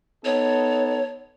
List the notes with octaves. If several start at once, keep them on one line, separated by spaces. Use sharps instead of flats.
B3 D#4 A4 C#5